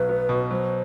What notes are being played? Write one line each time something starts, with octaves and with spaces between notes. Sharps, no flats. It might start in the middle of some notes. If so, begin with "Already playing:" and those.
Already playing: B1 F#3 B4
B3
B2
F#3 C5